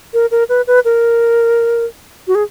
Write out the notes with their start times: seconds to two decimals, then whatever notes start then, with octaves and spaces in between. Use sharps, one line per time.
0.14 A#4
0.31 A#4
0.49 B4
0.67 B4
0.85 A#4
2.28 F#4
2.35 G#4